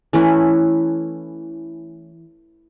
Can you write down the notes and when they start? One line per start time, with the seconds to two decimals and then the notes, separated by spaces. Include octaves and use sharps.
0.13 E3 A3 C#4 E4